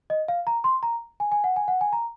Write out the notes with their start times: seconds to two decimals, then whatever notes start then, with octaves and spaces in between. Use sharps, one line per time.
0.10 D#5
0.28 F5
0.47 A#5
0.64 C6
0.83 A#5
1.20 G#5
1.32 G#5
1.44 F#5
1.56 G#5
1.68 F#5
1.81 G#5
1.93 A#5